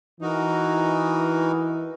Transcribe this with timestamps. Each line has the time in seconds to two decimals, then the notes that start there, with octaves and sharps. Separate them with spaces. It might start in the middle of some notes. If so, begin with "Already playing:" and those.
0.20 E3 D#4 F#4 A#4